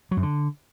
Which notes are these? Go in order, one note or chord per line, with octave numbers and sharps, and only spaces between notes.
F#3
F#2
D3